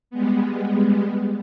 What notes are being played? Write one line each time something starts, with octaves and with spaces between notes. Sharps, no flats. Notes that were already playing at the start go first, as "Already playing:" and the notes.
G3 G#3 B3